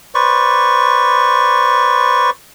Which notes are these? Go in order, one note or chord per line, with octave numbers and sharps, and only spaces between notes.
B4 C5 D5 C#6